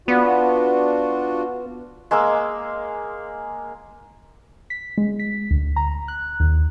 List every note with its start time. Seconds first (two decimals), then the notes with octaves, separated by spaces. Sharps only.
0.08 B3 D4 F4 F#4
2.11 G#3 A#3 D6 E6
4.70 B6
4.98 G#3
5.19 B6
5.51 D2
5.76 A#5
6.08 F#6
6.40 D#2